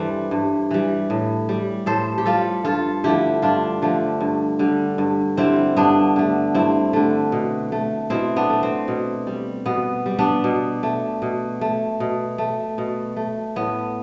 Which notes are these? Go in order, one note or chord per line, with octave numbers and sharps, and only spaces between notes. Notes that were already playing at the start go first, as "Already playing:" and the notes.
Already playing: G2 E3 G3 A4 C5
G2
E3 G3
A2
G3
A2 A4 C5
G4
G3 F4 A4
G2 F4 A4
D3 F3 A3 E4 G4
G2 D4 F4
D3 F3 A3
G2
D3 G3
G2
D3 G3 C4 E4
G2 B3 D4
D3 A3
G2 C4 E4
D3 A3
B2
A3
B2 C4 E4
B3 D4
A3
C4
B2
G3
B2 B3
G3
B3 D4
B2
A3
B2
A3
B2
A3
B2
A3
A2 B3